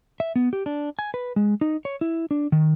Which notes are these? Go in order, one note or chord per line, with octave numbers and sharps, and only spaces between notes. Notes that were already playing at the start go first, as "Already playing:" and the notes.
E5
B3
G4
D4
G#5
B4
G#3
D#4
C#5
E4
D4
D#3